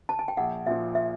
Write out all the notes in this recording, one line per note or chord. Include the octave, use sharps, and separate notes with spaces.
A5
G#5
G5
A#1 F#5
A#2 F3 E5
E5